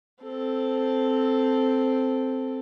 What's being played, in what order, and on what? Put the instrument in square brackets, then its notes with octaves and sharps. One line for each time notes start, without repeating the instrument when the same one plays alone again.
[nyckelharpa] C4 A4